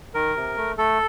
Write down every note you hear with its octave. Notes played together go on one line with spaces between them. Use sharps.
D#3 A#4
C3
A3
A3 A4